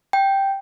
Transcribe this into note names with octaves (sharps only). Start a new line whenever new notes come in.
G5